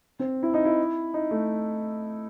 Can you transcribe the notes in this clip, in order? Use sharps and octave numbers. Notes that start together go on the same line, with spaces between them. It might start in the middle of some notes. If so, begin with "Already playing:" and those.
C4
E4
D#4
E4
D#4
A3